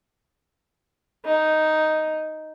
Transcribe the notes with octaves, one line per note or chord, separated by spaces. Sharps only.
D#4